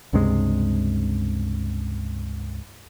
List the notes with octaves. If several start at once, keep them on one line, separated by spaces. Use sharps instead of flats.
C#2 G2 C3 G#3